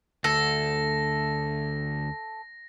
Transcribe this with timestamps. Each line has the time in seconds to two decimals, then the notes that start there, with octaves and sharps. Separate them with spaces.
0.24 D2 A4 A#6